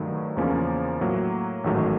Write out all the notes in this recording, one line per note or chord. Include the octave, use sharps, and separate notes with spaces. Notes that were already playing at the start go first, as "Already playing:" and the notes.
Already playing: G2 D#3 F#3 A3
E2 C#3 F3 A#3 C#4
A2 F#3 A#3
A1 G#2 D#3 F#3 A3